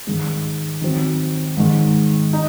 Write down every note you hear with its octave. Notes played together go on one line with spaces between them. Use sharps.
G#2 D#3 G#3 D#4
D#3 F#3 C4
G#2 D#3 G#3
D#4